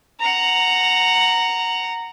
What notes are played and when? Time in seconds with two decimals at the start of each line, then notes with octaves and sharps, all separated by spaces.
0.20 F#5 A#5